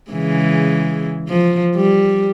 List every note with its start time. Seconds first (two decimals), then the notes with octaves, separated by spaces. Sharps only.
0.11 C#3 E3 G#3
1.29 F3
1.76 G3